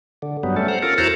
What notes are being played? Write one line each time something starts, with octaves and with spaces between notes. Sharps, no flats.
D3
G2 F#3 G3 B3
G3 A3 C#4 A4
C5 F#5 A#5
C#4 F4 A4 A#4
E2 E4 F#4 A4 C5 A#5